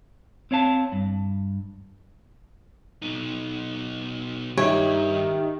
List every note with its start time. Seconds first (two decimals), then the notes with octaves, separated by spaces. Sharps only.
0.51 C4 C#5 F5 A5
0.92 G2
3.02 B2 D#4
4.58 G2 D#3 G4 C#5 E5